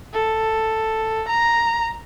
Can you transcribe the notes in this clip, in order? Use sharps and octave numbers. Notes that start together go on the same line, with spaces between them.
A4
A#5